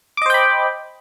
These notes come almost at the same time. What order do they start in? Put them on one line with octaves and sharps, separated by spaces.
D6 D#5 C5 G5 B5